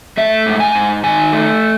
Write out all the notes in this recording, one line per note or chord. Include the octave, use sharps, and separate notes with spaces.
A3 E5
G#2
G#5
G#2
D#3 G#5
A3